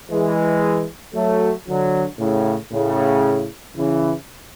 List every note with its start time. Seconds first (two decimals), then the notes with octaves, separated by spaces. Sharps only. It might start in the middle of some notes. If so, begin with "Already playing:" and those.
0.11 E3 G#3
1.14 F#3 A3
1.67 D3 F#3
2.19 A2 C#3
2.72 A2 C#3
3.76 C#3 E3